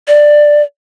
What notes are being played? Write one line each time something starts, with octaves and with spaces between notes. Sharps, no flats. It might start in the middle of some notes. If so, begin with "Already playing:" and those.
D5